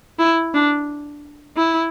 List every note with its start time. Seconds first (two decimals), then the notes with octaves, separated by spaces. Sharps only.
0.19 E4
0.54 D4
1.56 E4